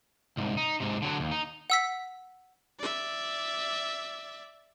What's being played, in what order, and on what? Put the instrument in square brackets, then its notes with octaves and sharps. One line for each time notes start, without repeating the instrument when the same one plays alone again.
[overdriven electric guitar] C2 G#2
D#4
G#2 C3
D3 F#3
D#2
D#4
[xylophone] F#5 E6 B6
[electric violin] D5 E5